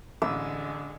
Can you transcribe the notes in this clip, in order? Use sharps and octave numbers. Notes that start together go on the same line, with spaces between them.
A1 D3 G#3 E6